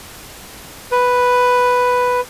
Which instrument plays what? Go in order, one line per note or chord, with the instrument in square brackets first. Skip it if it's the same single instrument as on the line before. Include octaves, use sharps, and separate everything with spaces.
[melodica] B4